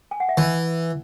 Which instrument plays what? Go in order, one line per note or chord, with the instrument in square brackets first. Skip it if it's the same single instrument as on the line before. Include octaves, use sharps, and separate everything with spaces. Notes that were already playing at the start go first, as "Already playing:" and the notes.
[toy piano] G#5
F#5
E5
[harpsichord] E3 [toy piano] D#5